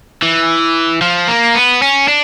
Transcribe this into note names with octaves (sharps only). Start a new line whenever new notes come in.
E3
F3
A#3
B3
C#4
D4